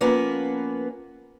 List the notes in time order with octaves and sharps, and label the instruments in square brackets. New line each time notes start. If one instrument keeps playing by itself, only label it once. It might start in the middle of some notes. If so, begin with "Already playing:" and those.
[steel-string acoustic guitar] F3 A#3 B3 C#4 B4